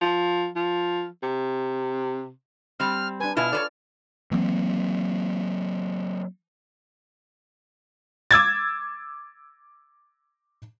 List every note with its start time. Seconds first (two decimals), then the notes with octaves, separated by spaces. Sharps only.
0.01 F3
0.56 F3
1.23 C3
2.80 G3 C4 F6
3.20 D4 B4 G#5
3.37 B2 E4 F4 B4 G#5 F6
3.53 A4 B4 C#5 D5
4.31 E3 F#3 A#3 C4
8.31 D6 E6 G#6 A6